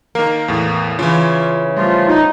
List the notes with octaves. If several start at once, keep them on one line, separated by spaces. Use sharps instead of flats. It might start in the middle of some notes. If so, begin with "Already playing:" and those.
D#3 A#3 A#4
E2 A2
C#3 E3 F4
F3 G3 A3 F4
D#4